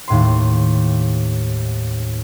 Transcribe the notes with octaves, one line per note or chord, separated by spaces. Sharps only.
D#2 A2 C6